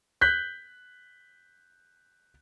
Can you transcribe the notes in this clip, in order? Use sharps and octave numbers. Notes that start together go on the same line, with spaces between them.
F#6 G6 B6